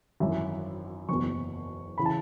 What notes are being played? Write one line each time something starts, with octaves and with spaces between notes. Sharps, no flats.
G#1 F#2 E3 E5
F#1 E2 B2 C#6
C#3 E3 B5
A5